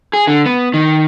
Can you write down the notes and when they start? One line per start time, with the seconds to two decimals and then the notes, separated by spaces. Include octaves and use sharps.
0.13 G#4
0.27 D3
0.46 B3
0.74 D#3